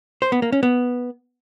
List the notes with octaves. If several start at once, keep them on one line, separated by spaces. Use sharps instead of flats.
C5
B3
A#3
C#4
B3